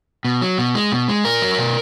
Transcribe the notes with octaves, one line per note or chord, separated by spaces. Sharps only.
B2
F#3
B2
G#3
B2
G#3
A#2 A#4
F#3
B2